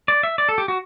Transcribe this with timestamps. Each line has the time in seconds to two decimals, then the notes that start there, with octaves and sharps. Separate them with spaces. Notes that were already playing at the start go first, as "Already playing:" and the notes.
0.08 D5
0.23 E5
0.38 D5
0.49 A4
0.58 G4
0.68 F#4